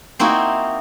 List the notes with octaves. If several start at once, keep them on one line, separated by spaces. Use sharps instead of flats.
A#3 C4 D#4 E4 F#4